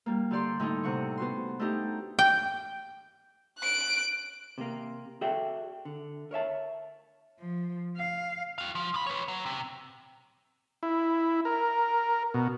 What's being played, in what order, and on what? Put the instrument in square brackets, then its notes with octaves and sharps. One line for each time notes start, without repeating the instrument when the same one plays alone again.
[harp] G3 A#3
D3 G4 D5 C6
A2 D3 A3 D#4
C3 F#5 C#6
B3 F#4 C6
A3 D4 D#4 G4
[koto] G5
[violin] F#6 D7
[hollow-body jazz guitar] C3 A#3
F#4 G#4 A4 D5 E5 G5
D3
A#4 C#5 E5 A5
[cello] F3
F5
[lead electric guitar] F#4 F5
F3
A2 B5
B4 C#5
F#3
C3
[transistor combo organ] E4
A#4
B2